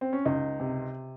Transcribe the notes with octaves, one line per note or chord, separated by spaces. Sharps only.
C4
C#4
C#2 D#4
C3